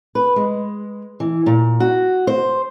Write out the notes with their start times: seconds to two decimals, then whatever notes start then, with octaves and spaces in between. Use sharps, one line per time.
0.15 B4
0.36 G#3
1.20 E3
1.46 A#2
1.80 F#4
2.27 C5